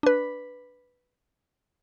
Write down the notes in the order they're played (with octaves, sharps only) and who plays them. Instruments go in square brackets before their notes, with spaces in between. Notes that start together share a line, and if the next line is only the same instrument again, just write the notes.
[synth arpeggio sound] D4 B4